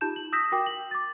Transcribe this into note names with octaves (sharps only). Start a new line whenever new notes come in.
D#4 F4 G4 A5 G6 E7
F#7
D#6 E6 G6 A#6 B6 E7
F#4 A#4 G5 D6
F#7
D6 A6